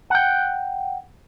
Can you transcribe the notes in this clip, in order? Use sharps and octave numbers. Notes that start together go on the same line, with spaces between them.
F#5 G5